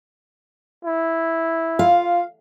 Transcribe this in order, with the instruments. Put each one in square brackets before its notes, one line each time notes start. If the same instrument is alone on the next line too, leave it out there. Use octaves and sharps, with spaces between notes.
[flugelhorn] E4
[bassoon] F4 [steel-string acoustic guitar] F5